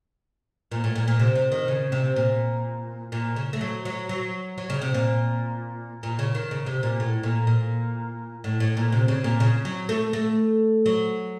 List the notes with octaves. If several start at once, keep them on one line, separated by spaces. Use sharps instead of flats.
A#2
A2
A#2
A#2
C3
C3
D#3
C#3
C3
A#2
A#2
C#3
A3
F#3
F#3
F#3
F#3
C#3
C3
A#2
A#2
C#3
D#3
C#3
C3
A#2
A2
A#2
A#2
A2
A2
A#2
C3
C#3
A#2
C#3
F#3
A3
A3
F#3